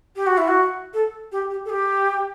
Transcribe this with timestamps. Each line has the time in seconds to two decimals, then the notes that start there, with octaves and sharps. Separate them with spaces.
0.16 G4
0.26 F#4
0.38 E4
0.48 F#4
0.94 A4
1.32 G4
1.50 G4
1.65 A4
1.69 G4